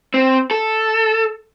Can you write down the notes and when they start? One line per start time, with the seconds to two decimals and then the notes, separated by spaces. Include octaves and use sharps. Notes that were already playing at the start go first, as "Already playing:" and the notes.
0.14 C4
0.51 A4